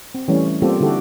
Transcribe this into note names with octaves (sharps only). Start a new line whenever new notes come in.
C4
E3 G3 A3 C#4
G3 A#3 C4 F4 G4 A4
D3 G3 E4 F#4 G4 A4